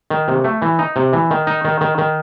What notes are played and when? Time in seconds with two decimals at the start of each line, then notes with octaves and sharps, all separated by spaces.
0.10 D#3
0.28 C3
0.44 A3
0.62 E3
0.79 D#4
0.96 C3
1.13 E3
1.31 D#3
1.47 D#4
1.65 D#3
1.81 D#3
1.98 D#3